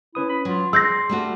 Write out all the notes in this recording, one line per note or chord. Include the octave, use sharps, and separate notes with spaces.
C#4 E4 B4 D#6
B5
F#3 F4
G#4 D5 C6 E6 G6 A#6
G3 A3 F#4